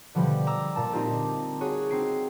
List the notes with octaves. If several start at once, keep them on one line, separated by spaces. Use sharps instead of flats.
B2 D3 F3 G3
A#5 D6 E6
A#2 A5
C4 D#4 F4 G4
F#4 G#4 C#5
C4 D#4 C7 D7